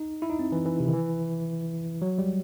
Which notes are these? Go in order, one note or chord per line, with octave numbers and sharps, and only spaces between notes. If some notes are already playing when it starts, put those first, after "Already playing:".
Already playing: D#4
E4
D#4
C4
E3
E3
C3
D#3
E3
F#3
G3